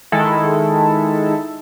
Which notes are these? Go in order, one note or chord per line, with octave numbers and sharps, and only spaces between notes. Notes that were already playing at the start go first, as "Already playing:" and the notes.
D#3 G#3 E4 A4